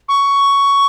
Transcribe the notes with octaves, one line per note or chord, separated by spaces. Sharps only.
C#6